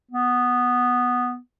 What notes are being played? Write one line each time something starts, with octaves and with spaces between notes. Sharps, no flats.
B3